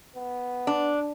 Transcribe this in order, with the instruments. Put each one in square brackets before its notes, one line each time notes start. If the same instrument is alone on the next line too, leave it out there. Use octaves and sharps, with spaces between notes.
[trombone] B3
[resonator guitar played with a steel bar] D4